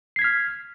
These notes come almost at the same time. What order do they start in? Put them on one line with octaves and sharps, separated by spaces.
C7 G#6 B6 F6